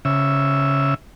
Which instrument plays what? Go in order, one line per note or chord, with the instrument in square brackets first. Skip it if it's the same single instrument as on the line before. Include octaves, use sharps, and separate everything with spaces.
[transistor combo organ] C#3 E5